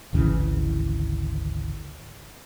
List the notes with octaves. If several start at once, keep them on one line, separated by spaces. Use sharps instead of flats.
G#1 D2 C#3 E3